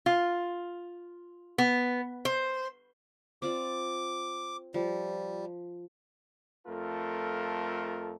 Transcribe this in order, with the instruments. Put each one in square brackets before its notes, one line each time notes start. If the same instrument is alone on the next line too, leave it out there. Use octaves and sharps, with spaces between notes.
[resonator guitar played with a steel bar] F4
B3
C5
[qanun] C4 F4 D5 [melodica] D6
[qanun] F3 [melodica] G3
[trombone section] F2 A3 F4 A4 A#4